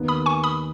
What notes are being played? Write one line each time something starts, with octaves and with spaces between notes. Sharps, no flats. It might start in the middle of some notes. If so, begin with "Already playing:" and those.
Already playing: D#2 D#3 B3
B5 D#6
G#5 C#6
B5 D#6